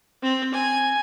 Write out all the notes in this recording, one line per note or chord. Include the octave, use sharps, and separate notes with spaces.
C4
G#5